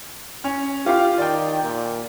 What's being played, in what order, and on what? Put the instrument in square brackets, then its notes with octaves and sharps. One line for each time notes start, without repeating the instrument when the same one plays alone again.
[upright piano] C#4
[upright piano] F4 F5 [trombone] G4
[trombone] D#3 [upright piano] D5 G5
[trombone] A#2